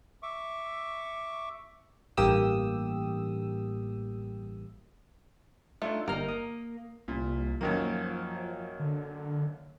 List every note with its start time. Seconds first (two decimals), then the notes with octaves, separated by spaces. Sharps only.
0.23 E5 C#6 D6
2.17 A1 G2 A#3 G4 D#6 E6
5.82 A3 D4 D#4 F4
6.08 G1 G3 A#3 D#4 A#4 F6
6.29 A#3 D#6
7.08 C2 A#2
7.61 F#2 D#3 F3 A#3
8.80 D3